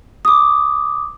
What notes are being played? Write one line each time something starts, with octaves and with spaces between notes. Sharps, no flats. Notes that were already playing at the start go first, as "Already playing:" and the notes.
D6 D#6